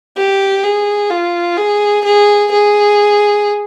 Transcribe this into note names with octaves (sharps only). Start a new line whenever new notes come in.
G4
G#4
F4
G#4
G#4
G#4